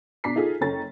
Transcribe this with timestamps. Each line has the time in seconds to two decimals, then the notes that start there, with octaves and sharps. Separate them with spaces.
0.24 B2 D4 A#5 D6 B6 C7
0.36 D#4 F4 G#4 A4
0.61 F#1 C#4 A4 G5 A#5 A6